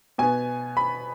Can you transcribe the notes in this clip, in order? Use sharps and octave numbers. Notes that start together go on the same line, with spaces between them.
B2 B3 G#5
B5